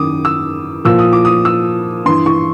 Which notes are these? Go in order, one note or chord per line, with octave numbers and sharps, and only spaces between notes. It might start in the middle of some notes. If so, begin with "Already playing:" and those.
Already playing: F#2 D#3 D6 D#6
E6
A#2 F3 E6
D#6
D6
D#6
E6
G2 E3 C6
C#6